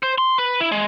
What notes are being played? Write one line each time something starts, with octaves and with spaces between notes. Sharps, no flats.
C5
C6
B4
E4
G#3